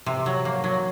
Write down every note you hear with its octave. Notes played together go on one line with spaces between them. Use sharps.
C3
F#3
A#3
F#3